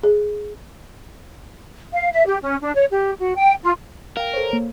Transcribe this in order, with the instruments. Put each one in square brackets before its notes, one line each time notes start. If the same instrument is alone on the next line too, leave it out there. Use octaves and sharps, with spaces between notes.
[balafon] G#4
[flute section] F5
E5
G4
C#4
D4
C#5
G4
F#4
G5
F4
[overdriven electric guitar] A#4 [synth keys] F5 G5
[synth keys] A4 C5 C#5
A#3